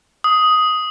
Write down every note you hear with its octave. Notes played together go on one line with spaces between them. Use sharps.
D#6